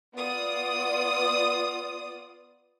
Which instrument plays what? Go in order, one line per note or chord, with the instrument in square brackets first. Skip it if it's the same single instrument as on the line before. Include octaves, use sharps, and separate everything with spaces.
[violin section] B3 F4 D5 D#6